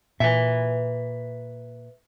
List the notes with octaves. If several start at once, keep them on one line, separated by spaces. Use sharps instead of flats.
A#2 B4 E5